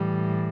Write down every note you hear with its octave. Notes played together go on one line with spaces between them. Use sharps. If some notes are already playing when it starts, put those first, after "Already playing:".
Already playing: A2 E3 G3